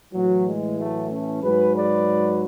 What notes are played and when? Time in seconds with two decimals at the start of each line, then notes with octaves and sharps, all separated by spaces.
0.13 A2 E3 F#3
0.46 G#3
0.77 F#3 A3
1.10 A3 C#4
1.43 G#2 F#3 G#4 B4
1.75 B4 D5